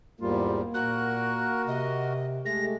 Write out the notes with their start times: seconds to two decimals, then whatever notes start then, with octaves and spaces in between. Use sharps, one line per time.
0.21 E2 G#2 G3 A#3 F4
0.74 A#2 F#4 A#4 F#6
1.67 C3 D#5
2.46 G#3 A3 G4 A#6